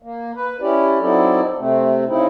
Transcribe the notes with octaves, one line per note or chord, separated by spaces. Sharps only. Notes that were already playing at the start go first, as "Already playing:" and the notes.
A#3
B4
C#4 E4 G4 D5
F#3 C4 D#4 E4 A4 D5
C3 A3 C4
C#3 C4 D#4 E4